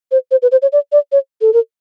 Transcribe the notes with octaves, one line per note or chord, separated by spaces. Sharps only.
C5
C5
B4
C5
C#5
D5
D5
C#5
A4
A#4